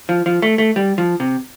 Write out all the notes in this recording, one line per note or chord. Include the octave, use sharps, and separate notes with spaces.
F3
F3
A3
A3
G3
F3
C3